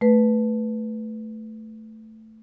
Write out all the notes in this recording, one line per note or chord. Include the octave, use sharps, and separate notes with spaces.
A3 B4